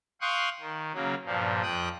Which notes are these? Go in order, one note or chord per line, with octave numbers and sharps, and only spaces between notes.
F5 G5 C6 C#6 D#6 F#6
D#3
C#3 F#3 A#3
G2 A#2 F3
F2 G5 D#6 F#6